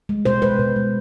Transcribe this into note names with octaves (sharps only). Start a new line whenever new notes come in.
G#3
B2 C5
G#3 B4
B2
G#3